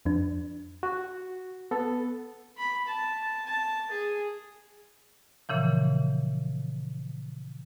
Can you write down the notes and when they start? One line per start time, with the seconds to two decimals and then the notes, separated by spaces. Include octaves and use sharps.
0.05 F2 F3 D4
0.83 F#4
1.71 B3 A4
2.58 B5
2.87 A5
3.46 A5
3.91 G#4
5.49 A#2 C#3 E3 F3